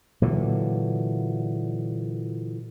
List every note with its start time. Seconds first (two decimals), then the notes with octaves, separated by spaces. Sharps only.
0.22 A#2 D3 E3 F#3